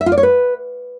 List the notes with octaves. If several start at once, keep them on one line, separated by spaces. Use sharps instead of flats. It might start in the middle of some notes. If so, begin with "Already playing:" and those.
E5
F4
D5
C#5
B4